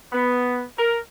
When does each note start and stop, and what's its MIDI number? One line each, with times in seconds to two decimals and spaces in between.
0.12 0.61 59
0.77 0.97 70